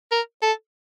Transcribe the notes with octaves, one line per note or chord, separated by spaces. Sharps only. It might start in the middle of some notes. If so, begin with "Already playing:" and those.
A#4
A4